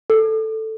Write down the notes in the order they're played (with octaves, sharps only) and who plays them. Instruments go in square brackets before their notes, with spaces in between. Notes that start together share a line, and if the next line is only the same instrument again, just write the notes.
[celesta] A4